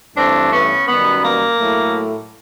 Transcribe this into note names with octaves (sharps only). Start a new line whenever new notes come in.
G2 E3 A3 C4 D4
B3 C#4
F#2 D#3 G3 B3
A#3
A2 F#3 A3